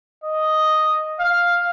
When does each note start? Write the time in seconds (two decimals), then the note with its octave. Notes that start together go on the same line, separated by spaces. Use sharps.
0.24 D#5
1.20 F5